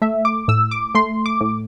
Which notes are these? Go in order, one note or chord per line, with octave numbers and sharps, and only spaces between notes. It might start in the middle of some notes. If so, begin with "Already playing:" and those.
A3 E5
D6
A2 E6
D6
A3 C6
D6
A2